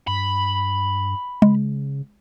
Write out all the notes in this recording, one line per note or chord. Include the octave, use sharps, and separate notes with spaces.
G2 B5
C#3 G#3